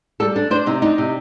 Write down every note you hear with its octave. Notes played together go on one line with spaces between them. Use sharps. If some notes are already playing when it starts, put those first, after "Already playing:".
G3 A4
D4
D4 C5
C3 D#4
D4 D#4
C3